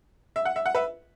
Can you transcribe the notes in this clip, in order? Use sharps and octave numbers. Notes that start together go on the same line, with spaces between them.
E5
F#5
E5
F#5
B4 E5